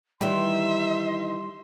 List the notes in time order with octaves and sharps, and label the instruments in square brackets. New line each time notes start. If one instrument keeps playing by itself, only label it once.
[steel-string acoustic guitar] D#3 E3 D#4 [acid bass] G3 [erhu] E5 [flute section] C6